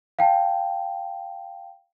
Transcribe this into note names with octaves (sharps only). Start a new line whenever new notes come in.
F5 G5 A5